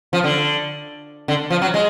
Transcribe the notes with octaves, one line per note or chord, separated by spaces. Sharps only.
F3
D3
D3
F3
F#3
G#3